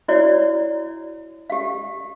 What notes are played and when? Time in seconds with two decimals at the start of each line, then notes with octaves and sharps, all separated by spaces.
0.08 E4 F#4 C#5 D5
1.50 G4 F5